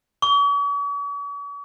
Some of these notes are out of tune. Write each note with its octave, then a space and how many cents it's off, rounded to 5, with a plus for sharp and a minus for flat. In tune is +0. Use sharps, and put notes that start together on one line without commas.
C#6 +45